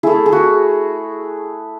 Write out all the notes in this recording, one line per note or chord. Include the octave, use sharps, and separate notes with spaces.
A3 E4 G#4
G#4
F#4